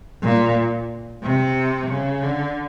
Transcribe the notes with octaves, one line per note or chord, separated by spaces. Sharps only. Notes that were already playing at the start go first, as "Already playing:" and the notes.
A#2
C3
C#3
D3